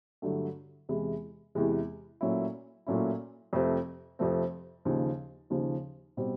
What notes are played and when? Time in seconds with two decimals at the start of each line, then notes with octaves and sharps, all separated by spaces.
0.22 G2 D3 F#3 A3
0.89 E2 C3 E3 G#3
1.55 E2 C3 E3 G#3
2.21 A#2 F#3 A3 C#4 E4
2.86 A#2 F#3 A3 C#4 E4
3.53 F2 C3 F3 A3 C4
4.19 F2 C3 F3 A3 C4
4.85 D#2 C#3 F3
5.50 D#2 C#3 F3
6.17 B2 G3 C4